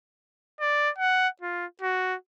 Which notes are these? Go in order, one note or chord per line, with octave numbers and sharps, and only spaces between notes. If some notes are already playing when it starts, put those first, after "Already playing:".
D5
F#5
F4
F#4